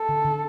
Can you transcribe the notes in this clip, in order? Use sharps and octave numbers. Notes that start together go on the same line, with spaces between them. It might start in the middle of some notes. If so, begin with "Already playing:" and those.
Already playing: A4
D3
D3